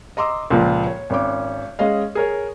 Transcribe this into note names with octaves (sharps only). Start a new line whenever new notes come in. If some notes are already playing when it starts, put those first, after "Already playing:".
D#5 A#5 C6 D6 E6
C#2 A#2 F3 A#3
C#5
G#1 C#4 D6
G#3 C#4 D#5 F5
G#4 A#4 C#5